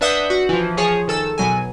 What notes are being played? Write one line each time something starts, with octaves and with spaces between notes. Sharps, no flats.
D4 B4 E5 F#5 D#6 G6
F#4
E3 F3
F3 G#4 C#5
D#3 A4 E6
B2 F#3 G#5